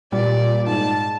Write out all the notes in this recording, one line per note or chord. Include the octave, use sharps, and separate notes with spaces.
A#2 G3 D5
G#2 A5